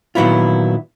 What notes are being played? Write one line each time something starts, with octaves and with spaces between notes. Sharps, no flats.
A#2 D#3 F#3 B3 E4 F4